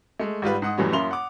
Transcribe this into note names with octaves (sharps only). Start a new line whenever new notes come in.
G#3 A3
G#1 G3 F4 B4
G#2 F#5 D#6
F#2 A2 E3 F#3 G3 C#4
F#2 A#3 E4 C6 F7 G7
F#5 D6